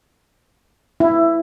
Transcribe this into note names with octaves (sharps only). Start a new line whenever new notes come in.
E4